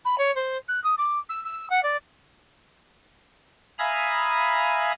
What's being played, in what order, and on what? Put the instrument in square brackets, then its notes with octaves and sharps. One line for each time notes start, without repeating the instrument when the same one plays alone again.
[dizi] B5
C#5
C5
F#6
D#6
D6
E6
E6
F#5
D5
[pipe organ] E5 F5 G#5 A#5 B5 D#6